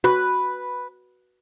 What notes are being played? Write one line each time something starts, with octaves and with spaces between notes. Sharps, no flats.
F#4 B4